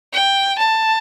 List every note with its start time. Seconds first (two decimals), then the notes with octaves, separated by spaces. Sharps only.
0.13 G5
0.59 A5